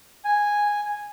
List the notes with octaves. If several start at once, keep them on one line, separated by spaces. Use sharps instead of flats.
G#5